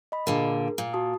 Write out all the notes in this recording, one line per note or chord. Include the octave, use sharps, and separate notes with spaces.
D#5 B5
A#2 D3 G#4 A#4
A#2
F#4 A5 D#6